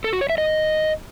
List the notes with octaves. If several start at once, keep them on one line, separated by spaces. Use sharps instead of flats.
A4
F#4
C#5
E5
D#5